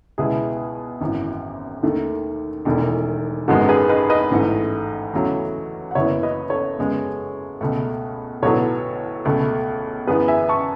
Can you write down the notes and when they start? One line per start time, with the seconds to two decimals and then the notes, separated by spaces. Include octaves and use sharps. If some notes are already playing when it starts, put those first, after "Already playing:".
0.18 C#2 B2 G#3 B3 E4 G#4
1.01 G#1 F#2 E3
1.83 D#2 D#3 A3
2.65 E1 E2 D#3 A3
3.48 G#1 F#2 D#3 G#3 B3 F#4 A4
3.69 G#4 B4
3.89 B4 D#5
4.10 B4 D#5
4.31 A1 G#2 E3 A3
5.14 E2 C#3 F#3 A3
5.91 F#5
5.95 F#1 F#2 E3 B3 C#5 E5
6.23 B4 D#5
6.50 A4 C#5
6.78 F#2 C#3 G#3 B3
7.61 C#2 B2 A3
8.42 B1 A2 F#3 B3 A4 C#5
9.25 C#2 B2 A3
10.07 F#2 E3 B3 G#4 B4
10.28 E5 G#5
10.49 A5 C#6